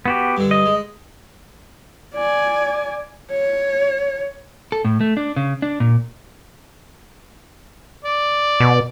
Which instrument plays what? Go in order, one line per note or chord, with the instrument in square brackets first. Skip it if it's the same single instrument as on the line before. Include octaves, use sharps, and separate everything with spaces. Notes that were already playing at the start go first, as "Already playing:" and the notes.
[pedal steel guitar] B3 F#4 G4
[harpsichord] G2 D3
[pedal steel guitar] D#5
[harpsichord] G#3
[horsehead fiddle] D5 G#5
C#5
[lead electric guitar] A4
A2
A3
D4
C#3
D4
A#2
[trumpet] D5
[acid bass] B2